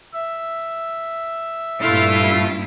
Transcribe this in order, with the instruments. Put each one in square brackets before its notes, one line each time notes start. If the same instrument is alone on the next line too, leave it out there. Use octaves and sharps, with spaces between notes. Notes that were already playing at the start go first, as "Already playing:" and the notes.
[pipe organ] E5
[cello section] G2 A#2 E4 [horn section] A3 F4